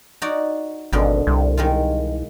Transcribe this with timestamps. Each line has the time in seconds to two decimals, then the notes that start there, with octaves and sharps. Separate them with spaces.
0.22 D#4 F#4 D5
0.93 G#1 G2 B2 D3
1.27 C2
1.57 D#3 G#3 F4